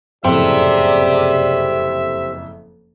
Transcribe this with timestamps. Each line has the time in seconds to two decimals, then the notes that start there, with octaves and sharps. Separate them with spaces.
0.25 F#1 F2 A2 G4 G#4 C5 D5 E5